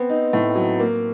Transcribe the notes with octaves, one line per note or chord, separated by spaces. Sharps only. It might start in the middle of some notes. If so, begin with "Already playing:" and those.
Already playing: B3 C4
D#4
A2
F#3
A#3